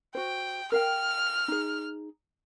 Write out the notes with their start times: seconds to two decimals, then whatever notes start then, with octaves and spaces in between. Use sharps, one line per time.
0.15 F#4 C5 G5
0.72 A#4 F5 G5 F6
1.48 D#4 G#4